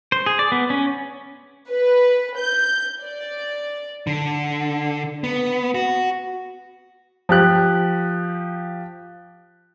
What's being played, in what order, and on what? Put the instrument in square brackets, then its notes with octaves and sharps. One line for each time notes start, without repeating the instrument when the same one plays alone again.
[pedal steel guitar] C5
G#4
D5
B3
C#4
[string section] B4
G6
D5
[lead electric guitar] D3
B3
F#4
[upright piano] F3 G4 F#6